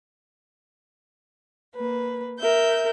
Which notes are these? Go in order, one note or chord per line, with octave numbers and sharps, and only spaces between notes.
A#3 B4
A#4 E5 G6